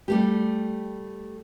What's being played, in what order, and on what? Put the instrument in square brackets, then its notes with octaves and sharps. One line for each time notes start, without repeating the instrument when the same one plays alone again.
[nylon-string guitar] G3 A3 G4